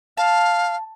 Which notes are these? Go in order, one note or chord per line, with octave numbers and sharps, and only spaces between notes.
F5 A5